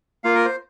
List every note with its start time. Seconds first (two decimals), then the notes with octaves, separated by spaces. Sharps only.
0.24 A#3 F4 F5
0.35 A#4
0.45 C5